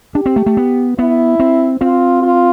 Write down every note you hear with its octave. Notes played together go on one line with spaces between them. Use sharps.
D4 G4
C4
A3
A3
B3
B3 E4
C4
C4 F4
F4